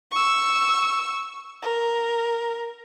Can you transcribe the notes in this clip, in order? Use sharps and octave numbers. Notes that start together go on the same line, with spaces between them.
C#6 E6
A#4